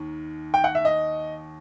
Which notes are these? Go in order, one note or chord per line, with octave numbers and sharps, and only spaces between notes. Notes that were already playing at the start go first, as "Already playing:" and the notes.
Already playing: D#2 D#3
G5
F#5
E5
D#5